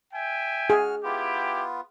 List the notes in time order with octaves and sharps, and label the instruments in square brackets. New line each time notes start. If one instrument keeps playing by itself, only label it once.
[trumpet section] E5 G5 G#5
[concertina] F#4 F6 [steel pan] G#4
[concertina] B3 F4 [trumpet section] E4 G4